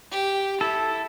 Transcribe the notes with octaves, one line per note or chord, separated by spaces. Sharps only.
G4
E4 A4